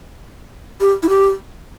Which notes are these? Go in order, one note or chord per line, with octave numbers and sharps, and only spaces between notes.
G4
E4
G4